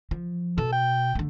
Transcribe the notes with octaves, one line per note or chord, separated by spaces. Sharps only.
F3
B2 A4
G5
D3 A3